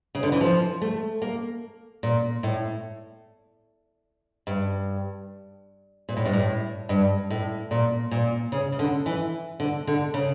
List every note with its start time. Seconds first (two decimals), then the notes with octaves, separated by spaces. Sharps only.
0.15 C#3
0.23 D3
0.32 E3
0.41 F3
0.81 A3
1.22 A#3
2.03 A#2
2.43 A2
4.47 G2
6.09 A#2
6.17 A2
6.25 G2
6.33 A2
6.89 G2
7.30 A2
7.71 A#2
8.11 A#2
8.52 C#3
8.72 C#3
8.79 D3
9.06 E3
9.60 D3
9.87 D3
10.14 C#3